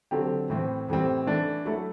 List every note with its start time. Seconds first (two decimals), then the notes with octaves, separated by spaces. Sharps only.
0.11 D3 F#3 C4 G4
0.50 A2 E3 A3 C4
0.88 A2 E3 G3 C4
1.27 E3 A3 D4
1.65 F#3 A3 E4 A4